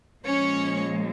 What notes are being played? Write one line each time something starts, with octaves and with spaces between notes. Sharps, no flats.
A#2 F3 G#3 C#4 C#5